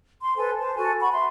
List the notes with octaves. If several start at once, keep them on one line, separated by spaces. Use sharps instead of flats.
C6
A4 B4 C5 G#5
C5 A5
F#4 A4 G#5
F#5 B5 C#6
E5 C6